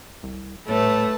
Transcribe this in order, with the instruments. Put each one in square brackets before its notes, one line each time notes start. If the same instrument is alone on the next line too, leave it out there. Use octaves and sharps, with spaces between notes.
[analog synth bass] C2
[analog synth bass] D#1 [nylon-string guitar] A2 [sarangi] A3 [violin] B4 A5